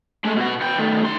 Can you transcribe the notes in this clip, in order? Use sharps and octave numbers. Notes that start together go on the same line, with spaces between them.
G#3 A3
B2 F#4
B3 G5
D#3 A3
D#3 C6